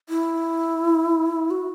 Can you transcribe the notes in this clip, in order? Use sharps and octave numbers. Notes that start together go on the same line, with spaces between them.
E4
F#4